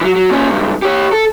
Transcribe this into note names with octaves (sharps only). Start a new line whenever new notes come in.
E3 F#3
F#3
A#2 C#4
C#2 G2
G4 C#5
A4